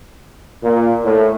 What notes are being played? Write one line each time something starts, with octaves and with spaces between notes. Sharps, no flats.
A#2
A2